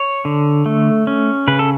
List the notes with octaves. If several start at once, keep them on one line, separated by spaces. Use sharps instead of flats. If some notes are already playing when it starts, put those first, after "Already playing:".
Already playing: C#5
D3
A3
C#4
C#3 B4
A4